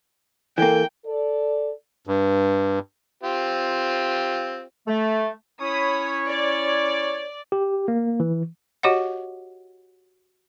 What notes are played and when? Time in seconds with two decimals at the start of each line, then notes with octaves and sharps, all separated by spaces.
0.58 E3 A#3 A4 G5
1.05 A4 D5
2.07 G2
3.23 C4 F4 G4
4.87 A3
5.61 C#4 E4 C#5 B5 D#6
6.29 D5
7.52 G4
7.88 A#3
8.20 E3
8.83 F#4 G4 C#5 D#5 F#5